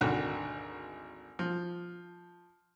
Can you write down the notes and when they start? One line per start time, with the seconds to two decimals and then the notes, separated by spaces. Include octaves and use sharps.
0.01 G#1 D2 D#3 F#5
1.39 F3